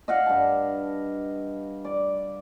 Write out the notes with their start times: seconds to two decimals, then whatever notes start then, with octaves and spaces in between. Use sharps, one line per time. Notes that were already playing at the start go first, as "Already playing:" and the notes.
0.08 D#5 F5 F#5
0.26 G2 A5
1.85 D5